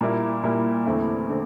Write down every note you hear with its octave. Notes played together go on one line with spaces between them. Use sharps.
A#2 G3 A#3 E4
A#2 G3 A#3 E4
E2 D3 A3 C4 E4
D3 A3 C4